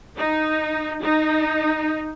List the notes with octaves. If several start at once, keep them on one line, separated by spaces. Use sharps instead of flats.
D#4
D#4